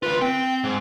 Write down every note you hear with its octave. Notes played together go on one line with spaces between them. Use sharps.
D2 F4 B4
C4 G5
G#2